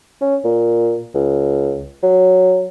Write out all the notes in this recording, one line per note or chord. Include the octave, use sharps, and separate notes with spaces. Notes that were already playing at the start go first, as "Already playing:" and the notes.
C#4
A#2
C#2
F#3